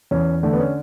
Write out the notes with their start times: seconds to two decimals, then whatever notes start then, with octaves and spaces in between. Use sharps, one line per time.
0.11 E2 C#4
0.43 D3 A3
0.53 B3
0.59 C#4